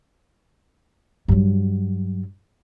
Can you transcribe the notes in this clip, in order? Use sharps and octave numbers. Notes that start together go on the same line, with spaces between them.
G2 F#3